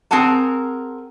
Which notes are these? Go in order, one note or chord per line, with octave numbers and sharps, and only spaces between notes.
C4 G#4 A#4 F#5 A5